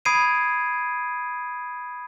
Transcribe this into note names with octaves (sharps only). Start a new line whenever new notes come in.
B5 D#6 G#6 C7 D7 D#7